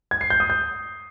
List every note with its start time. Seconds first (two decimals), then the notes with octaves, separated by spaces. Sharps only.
0.11 G#6
0.21 C7
0.30 G6
0.40 D#6
0.50 G6